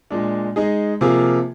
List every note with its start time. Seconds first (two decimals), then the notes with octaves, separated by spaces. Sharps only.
0.10 A#2 G#3 D4
0.56 G#3 D#4 G#4
1.01 C3 F3 A#3 F4 G#4